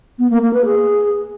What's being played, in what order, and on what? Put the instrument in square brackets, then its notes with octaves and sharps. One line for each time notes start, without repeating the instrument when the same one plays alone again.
[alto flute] B3
A#3
A#3
B4
G#4